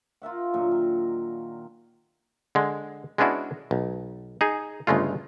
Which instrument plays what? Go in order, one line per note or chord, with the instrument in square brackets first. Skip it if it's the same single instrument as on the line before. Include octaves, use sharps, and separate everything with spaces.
[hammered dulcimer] F4 A#4 E5 F#5
A#2 D3 F#3
D#3
[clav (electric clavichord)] D3 G#3
G#3 B3 C#4 D4 E4 F#4
B1
D#4 G#4
G1 C#3 G#3 A3 F4